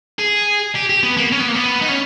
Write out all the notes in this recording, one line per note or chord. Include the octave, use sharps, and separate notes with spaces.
G#4
G4
G4
B3
A#3
C#4
B3
A#3
B3
D#4
C#4